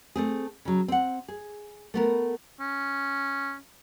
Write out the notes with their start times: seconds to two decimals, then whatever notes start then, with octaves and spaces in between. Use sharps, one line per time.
0.16 A3 C4 G#4
0.65 C#3 F#3
0.88 C4 F#5
1.28 G#4
1.94 A3 B3 A#4
2.60 C#4